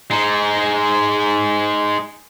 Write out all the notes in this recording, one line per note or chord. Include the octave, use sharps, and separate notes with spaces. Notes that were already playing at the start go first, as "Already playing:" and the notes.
G#3 D#4